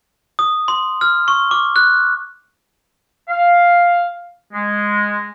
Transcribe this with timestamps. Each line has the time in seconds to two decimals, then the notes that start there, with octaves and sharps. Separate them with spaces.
0.39 D#6
0.68 C6
1.01 F6
1.28 C#6
1.51 D6
1.76 F#6
3.29 F5
4.53 G#3